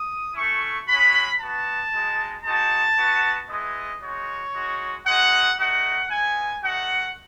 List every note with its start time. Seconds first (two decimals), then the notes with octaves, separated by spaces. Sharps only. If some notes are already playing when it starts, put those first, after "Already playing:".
Already playing: D#6
0.35 A3 C#4 E4 C#6
0.87 G#3 C#4 F#4 B5
1.39 B3 F#4 A5
1.93 G#3 D#4 F#4
2.44 G#3 D#4 F#4 A5
2.96 B3 F#4
3.48 G#3 B3 E4 D#5
4.01 G#3 D#4 F#4 C#5
4.54 G#3 D#4 F#4
5.06 G#3 D#4 F#4 F#5
5.58 A3 D#4 F#4 F#5
6.10 G#3 B3 E4 G#5
6.63 A3 D#4 F#4 F#5